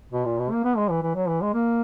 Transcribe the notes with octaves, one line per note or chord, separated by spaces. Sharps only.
B2
A#2
B2
A#3
B3
G#3
E3
E3
F#3
E3
G#3
A#3